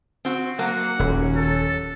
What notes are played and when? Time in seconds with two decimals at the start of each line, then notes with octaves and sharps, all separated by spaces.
0.25 C4 F#4
0.59 F#3 A#3 A#4 F#5
0.99 D#1 C#4
1.37 A4